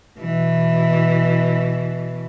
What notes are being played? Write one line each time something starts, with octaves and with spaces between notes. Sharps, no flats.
B2 E3